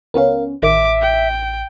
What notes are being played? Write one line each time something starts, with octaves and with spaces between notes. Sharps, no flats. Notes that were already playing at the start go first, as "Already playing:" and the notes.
C#2 B3 C#4 A#4 F5
A1 D#3 E5 D6
G5